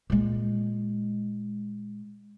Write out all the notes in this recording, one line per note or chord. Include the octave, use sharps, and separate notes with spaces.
A#2 G#3